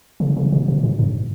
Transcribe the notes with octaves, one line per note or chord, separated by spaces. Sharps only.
C#3
C#3
B2
B2
A2
G2